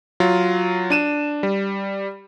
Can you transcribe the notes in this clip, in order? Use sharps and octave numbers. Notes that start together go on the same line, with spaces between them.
F#3 F4
D4 D#7 E7
G3